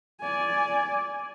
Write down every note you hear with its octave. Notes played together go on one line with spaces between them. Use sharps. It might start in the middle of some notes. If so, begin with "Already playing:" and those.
D5 G#5